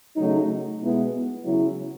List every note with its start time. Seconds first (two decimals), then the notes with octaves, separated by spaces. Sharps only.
0.16 C#3 F#3 A3 D#4
0.81 B2 G#3 B3 E4
1.44 C#3 F#3 C#4 E4